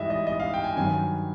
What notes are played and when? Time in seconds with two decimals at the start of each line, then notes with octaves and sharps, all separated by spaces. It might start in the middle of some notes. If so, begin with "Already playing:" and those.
Already playing: G#2 E3 G3 D#5 E5
0.10 D#5
0.27 D#5
0.40 F5
0.54 G5
0.64 G#5
0.76 G2 D#3 F#3 G#5